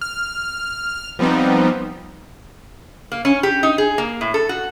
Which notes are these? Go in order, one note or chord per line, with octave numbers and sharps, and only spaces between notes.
F6
F3 G3 B3 C4 D#4
A#3
C#4
G4
D#4
G#4
A#3
A2
A4
F#4